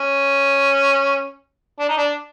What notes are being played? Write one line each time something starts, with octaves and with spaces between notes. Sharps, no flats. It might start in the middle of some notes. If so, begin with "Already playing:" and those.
Already playing: C#4
D4
D#4
D4